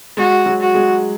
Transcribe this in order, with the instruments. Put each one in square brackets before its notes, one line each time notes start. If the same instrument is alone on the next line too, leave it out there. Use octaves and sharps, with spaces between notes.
[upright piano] G#3 [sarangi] F#4
[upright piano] F#3
[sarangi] F#4
[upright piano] G#3